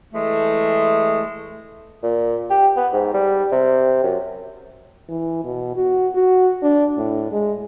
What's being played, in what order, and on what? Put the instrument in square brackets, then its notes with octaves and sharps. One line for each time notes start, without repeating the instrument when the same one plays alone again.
[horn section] E3 G#3 A3
[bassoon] A#2
G4
B3
G#2
G3
C3
F#2
[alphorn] E3
B2
F#4
F#4
D4
A2
G#3